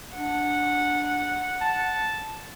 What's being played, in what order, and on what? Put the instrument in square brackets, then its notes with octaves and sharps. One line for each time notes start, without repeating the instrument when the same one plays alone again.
[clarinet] D4 [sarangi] F#5
[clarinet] A5